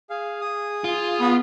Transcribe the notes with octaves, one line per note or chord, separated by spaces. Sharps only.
G#4 F5
G#4 D#6
F4
B3